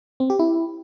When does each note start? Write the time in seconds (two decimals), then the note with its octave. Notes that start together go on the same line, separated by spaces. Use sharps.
0.20 C4
0.30 G4
0.39 E4